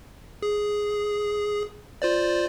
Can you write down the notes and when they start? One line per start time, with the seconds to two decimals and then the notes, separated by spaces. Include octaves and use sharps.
0.42 G#4
2.02 F4 C5 D5